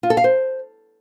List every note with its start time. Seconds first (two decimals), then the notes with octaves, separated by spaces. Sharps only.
0.03 F4
0.10 A4
0.17 F5
0.24 C5